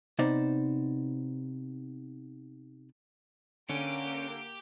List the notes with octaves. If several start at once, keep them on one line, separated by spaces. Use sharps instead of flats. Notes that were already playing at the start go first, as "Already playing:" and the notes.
C3 B3 D#4 C5 D5
D3 A#3 C#4 G4 D7